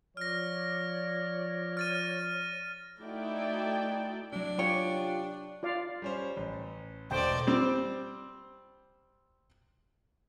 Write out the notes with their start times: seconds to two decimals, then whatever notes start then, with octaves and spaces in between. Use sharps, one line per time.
0.17 F3 C#5 D5 F6 A#6
1.77 F6 A6 D#7
2.99 A3 D#4 E4 F#4 D5 G5
4.32 C3 F#3 D4
4.59 F4 G4 C#5
5.63 F4 D5 F5
6.02 G3 C#4 C5
6.37 A1
7.11 E1 A3 C5 D5 G5
7.47 G3 C4 C5